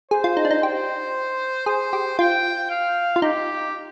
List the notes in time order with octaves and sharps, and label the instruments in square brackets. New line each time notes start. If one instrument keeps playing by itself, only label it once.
[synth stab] G#4 [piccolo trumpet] C5
[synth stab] F4
D#4
D4
D#4
[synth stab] G4 [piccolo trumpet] C5
[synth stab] G#4 [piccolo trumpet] C5
[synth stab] G4
[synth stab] F4 [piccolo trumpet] G5
[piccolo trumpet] F5
[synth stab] F4
[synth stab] D#4 [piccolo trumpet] G4